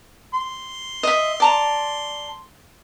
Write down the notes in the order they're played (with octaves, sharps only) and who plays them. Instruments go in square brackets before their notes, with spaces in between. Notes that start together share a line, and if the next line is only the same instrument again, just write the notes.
[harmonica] C6
[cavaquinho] D#5 E5
D5 A5 A#5